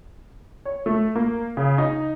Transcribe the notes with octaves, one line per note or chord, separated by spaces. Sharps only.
C#5
A3
A#3
C#3
D#4